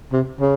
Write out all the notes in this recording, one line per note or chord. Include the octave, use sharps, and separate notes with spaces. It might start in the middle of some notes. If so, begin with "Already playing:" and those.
C3
C#3